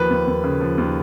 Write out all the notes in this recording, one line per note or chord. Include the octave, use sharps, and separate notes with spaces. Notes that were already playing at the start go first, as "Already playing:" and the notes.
Already playing: D#2 F3 B4
D#2
D#2
C#3
F3
D#2